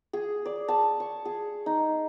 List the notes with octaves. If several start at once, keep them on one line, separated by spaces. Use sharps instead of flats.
G#4
D5
A5
C#6
G#4
D#4